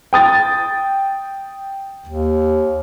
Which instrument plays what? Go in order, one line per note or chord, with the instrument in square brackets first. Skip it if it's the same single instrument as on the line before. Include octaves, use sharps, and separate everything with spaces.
[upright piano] G5 D#6 A6
[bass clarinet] D#2